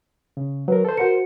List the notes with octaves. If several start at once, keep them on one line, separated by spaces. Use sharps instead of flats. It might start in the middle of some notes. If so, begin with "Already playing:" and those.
C#3
F#3 A#4 B4
A4 C5
F#4 A#4 C5 F#5 C#7